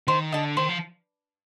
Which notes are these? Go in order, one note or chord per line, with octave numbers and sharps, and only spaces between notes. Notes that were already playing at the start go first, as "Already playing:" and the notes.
D#3 C5
D3 D#5 A5
D#3 C5
F3